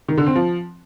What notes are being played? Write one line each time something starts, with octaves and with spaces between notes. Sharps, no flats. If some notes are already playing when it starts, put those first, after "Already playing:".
D#3
D3
C4
F3